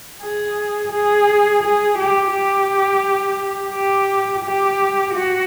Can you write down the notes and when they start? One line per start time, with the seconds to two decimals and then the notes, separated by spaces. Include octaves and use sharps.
0.22 G#4
0.92 G#4
1.63 G#4
1.98 G4
2.33 G4
3.73 G4
4.44 G4
5.14 F#4